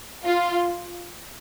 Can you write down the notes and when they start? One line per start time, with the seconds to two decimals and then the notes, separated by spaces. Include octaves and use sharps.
0.25 F4